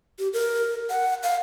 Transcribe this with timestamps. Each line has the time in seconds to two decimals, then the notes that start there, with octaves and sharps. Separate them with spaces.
0.19 G4
0.33 A#4
0.90 F#5
1.23 F5